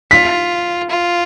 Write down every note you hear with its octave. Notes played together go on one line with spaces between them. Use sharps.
F4 B6
F4